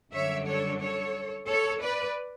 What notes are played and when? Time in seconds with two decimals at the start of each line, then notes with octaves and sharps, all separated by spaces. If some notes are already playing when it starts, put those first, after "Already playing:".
0.13 F#2 D3 G3 D4 C#5 E5
0.47 A4 C#5
0.81 A4 C#5
1.49 A4 C#5
1.82 B4 D5